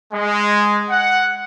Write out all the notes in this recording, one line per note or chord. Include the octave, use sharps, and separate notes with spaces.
G#3
F#5